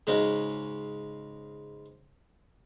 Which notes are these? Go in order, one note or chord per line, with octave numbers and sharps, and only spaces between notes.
G#2 C#3 G#3 C#4 D#4 F#4